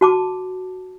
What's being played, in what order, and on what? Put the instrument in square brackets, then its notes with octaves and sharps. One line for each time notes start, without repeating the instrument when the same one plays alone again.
[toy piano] F#4 A5 D6